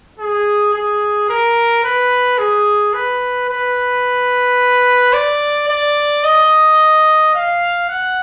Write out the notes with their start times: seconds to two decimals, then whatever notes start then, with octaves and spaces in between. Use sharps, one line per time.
0.19 G#4
0.74 G#4
1.29 A#4
1.84 B4
2.38 G#4
2.94 B4
3.49 B4
5.13 D5
5.69 D5
6.24 D#5
7.34 F5
7.89 F#5